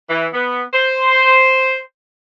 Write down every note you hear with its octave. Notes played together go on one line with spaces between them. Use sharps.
E3
B3
C5